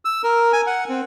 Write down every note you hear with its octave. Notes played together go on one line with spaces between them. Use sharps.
E6
A#4
G#5
F#5
C4